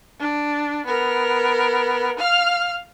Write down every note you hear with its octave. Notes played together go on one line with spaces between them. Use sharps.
D4
B3 A#4
F5 F6